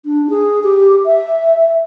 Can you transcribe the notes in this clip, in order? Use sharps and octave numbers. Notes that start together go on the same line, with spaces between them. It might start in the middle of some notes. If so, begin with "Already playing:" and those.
D4
G#4
G4
E5